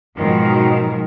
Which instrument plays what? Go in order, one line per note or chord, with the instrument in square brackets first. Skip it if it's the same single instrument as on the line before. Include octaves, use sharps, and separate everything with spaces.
[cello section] G#2 B2 D#3 F3 F#3 A#4